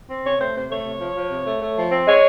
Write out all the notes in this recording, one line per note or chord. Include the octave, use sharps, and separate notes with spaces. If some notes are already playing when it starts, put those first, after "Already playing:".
C4
C3 C#5
A3 C5
C3 C5
A3 C#5
C3
F3
F3
C3
A3
A3
F3
C4
G#3 C#5